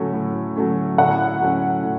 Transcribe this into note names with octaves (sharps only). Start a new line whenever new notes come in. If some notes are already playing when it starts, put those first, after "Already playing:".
Already playing: A2 F#3 A3 C#4
A2
F#3 A3 C#4
A2 F#5
F#3 A3 C#4
A2